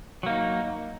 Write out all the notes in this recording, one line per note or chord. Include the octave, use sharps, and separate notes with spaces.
F#3 A#3 D#4